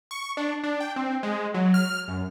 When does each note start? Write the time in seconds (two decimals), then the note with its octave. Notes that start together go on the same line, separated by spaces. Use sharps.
0.11 C#6
0.37 D4
0.64 D4
0.80 G5
0.96 C4
1.23 G#3
1.54 F#3
1.74 F6
2.08 F#2